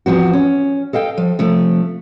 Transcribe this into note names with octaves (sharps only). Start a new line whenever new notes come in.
E2 F3 C4 F#4
C#4
A4 D#5 F5 G5
F3
C3 F3 A3